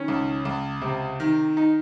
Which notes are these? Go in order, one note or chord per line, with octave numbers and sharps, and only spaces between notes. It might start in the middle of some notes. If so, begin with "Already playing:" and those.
Already playing: D#3 C#4
C#2
C#2
C3
D#3
D#4